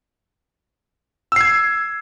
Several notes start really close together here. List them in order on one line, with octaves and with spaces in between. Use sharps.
E6 C7 G#6